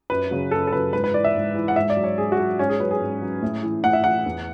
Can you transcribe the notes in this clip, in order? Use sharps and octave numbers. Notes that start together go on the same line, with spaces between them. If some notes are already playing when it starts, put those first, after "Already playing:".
F#2 B4
C#3 F#3
F#2 A4
A4
C#3 F#3 B4
G#2 B4
B4
E3 D5
E5
G#2
E3
F#5
G#2 E5
D5
F#3
C#5
G#2 G#4
F#4
F#3
G#2 C#4
G#4
F#3 B4
G#4
G#2
F#3
A2
E3
A2 F#5
E5
E3 F#5
E2